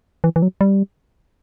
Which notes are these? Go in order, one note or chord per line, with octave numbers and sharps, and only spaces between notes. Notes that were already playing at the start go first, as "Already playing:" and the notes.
E3
E3
F#3
G3